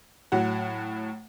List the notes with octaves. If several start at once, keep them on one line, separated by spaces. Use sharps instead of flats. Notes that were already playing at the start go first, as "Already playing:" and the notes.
A2 F#3 F#5